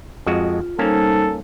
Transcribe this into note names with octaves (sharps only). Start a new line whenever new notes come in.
F2 G#3 F4 F#4
G3 A#3 C#4 D#4 A4 C5 A5